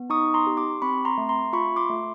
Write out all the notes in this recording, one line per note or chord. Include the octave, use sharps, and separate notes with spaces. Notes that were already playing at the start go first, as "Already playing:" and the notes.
Already playing: B3
D#4 C#6 D#6
A#5 C6
G4
C6 D6
C4 B5 C#6
A#5 C6
A3
A#5 C6
F4 B5 C#6
C6 D6
A3